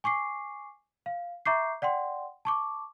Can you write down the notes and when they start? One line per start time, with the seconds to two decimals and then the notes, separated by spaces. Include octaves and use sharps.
0.04 G#5 C#6 D6 C7
1.06 F5
1.46 E5 A#5 C#6 D6 G6 C7
1.82 D5 F#5 G5 C6
2.45 A5 C#6 D6